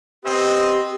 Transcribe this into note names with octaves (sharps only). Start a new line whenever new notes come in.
B3 C4 G4 D#5